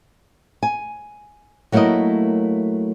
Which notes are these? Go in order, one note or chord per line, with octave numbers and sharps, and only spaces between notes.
G#5
F#3 A3 A#3 E4 A#4 D#5